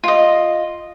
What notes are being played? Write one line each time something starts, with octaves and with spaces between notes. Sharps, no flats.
F4 D#5